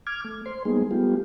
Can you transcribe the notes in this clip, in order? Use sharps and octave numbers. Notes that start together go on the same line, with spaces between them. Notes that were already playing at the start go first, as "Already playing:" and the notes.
D6 F6 G#6
A3
C5 C6
G3 G#3 A#3 B3 D#4 G#4
G3 A3 B3 F4 G4